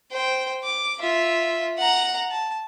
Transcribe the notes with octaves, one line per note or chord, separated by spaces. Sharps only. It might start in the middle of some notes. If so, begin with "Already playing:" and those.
C5 G5
D6
F4 E5
F#5 A#5
A5